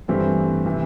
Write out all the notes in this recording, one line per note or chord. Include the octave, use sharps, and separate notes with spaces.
G2 E3 A3 C4 G4
C3 E3